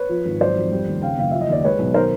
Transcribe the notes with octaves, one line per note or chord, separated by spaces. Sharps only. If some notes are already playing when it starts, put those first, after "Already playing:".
Already playing: B4 C#5
F3
G#1
F#3 C5 D5
F2
G3
D#2
C#3 F5 G5
F#1 F5
F3 E5
D#5
D#2 D5
G#3 B4 C#5
B1
D#3 A#4 C5